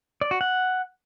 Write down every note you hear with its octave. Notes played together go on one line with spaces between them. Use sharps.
D5
F#4
F#5